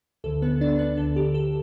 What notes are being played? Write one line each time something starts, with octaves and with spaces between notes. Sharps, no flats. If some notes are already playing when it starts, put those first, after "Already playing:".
D2 D3 A4
B3 B4
D4 D5
B3 B4
D2 D3 A4
G4
A4